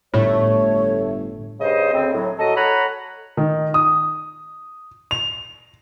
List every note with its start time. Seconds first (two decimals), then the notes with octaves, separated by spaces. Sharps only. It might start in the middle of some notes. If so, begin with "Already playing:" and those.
0.14 G1 A2 A3 C#5
1.60 G2 C#3 C5 D#5
1.93 D2 C#3 C4
2.13 A2 F#3
2.40 F#3 A4 D#5
2.56 A4 C#5 F#5 A#5 B5
3.37 D#3
3.74 D#6
5.11 F7